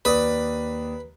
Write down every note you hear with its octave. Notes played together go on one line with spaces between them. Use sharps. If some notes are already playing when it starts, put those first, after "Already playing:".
D#2 B4 D5 D#6